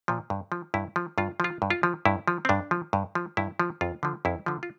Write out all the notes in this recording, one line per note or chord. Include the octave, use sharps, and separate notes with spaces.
A#2 F3
G2
F3
G2 E4
F3
G2 F4
F3 F4
G2
F4
F3
G2 E4
F3
C4
G2 D4
F3
G2
F3
G2 E4
F3
F2 F4
D3 F3
F2 E4
D3 F3
F4